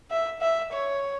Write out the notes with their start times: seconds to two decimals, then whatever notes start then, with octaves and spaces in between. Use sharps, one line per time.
0.11 E5
0.41 E5
0.73 C#5